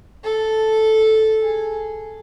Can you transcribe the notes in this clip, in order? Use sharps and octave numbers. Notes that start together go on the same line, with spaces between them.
A4
G#4